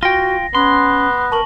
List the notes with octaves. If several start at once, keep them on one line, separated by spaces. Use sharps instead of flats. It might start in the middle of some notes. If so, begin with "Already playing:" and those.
F4 F#4 G5 A#6
B3 C#4 C6
A#4 A5 C#6 F#7